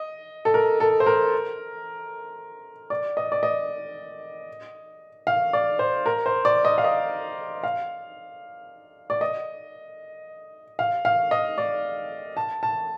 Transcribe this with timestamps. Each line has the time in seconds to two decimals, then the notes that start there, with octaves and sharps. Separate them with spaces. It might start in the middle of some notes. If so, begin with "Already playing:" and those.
Already playing: D#5
0.45 A4
0.54 A#4
0.80 A4
1.00 C5
1.06 A#4
2.90 D5
3.17 D#5
3.32 D5
3.43 D#5
5.27 F5
5.53 D5
5.79 C5
6.06 A#4
6.26 C5
6.45 D5
6.65 D#5
6.78 F5
6.84 D#5
7.63 F5
9.10 D5
9.21 D#5
10.79 F5
11.05 F5
11.31 D#5
11.58 D5
12.37 A5
12.63 A5